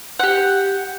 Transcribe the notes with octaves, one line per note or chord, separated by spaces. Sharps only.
G4 F#5